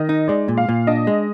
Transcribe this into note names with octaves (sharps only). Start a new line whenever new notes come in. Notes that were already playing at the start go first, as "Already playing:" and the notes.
Already playing: D#3 D#5
D#4
G#3 D5
A#2
F5
A#2
D4 D#5
G#3